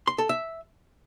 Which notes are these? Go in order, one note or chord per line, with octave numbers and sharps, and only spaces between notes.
C6
A4
E5